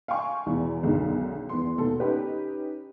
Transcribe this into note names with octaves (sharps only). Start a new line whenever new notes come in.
F5 G5 G#5 C#6
E2 B2
B1 F#2 D3 D#3 G#3
E2 B3 C6
D#2 B2 A4
C#4 D#4 G4 B4